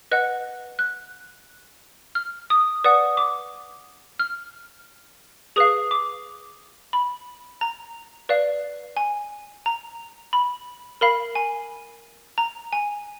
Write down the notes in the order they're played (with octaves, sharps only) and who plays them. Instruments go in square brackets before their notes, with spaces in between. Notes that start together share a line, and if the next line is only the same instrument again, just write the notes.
[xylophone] B4 D#5 F#5 F#6
F#6
F6
D#6
B4 D5 F#5 D#6
D6
F6
G#4 B4 F5 D#6
D6
B5
A#5
B4 D5 F5
G#5
A#5
B5
A#4 F5 B5
G#5
A#5
G#5